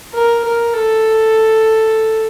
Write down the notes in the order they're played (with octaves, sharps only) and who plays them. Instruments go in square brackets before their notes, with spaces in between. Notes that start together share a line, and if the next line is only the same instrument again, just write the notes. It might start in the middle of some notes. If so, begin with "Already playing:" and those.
[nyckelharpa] A#4
A#4
A4